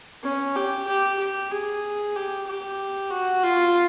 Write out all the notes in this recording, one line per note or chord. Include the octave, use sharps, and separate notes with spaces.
C#4
G4
G4
G4
G#4
G4
G4
F#4
F4